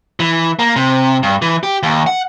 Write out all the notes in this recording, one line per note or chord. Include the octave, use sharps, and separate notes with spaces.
E3
A#3
C3
G2
E3
G4
D#2
F#5